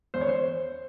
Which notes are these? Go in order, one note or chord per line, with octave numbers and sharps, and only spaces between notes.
E2 C5
C#5
C5